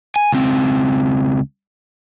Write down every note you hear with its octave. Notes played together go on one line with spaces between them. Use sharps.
G#5
C#2 C4